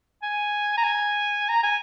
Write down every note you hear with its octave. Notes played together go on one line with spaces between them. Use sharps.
G#5
A#5
G#5
A#5
G#5